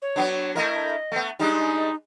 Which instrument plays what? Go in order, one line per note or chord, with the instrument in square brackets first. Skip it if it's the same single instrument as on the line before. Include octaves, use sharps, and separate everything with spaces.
[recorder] C#5
[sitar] F#3 B3 D4
[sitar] A3 E4 A#4 [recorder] D#5
[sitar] A3 B3
[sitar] G3 G#3 D4 [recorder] D#4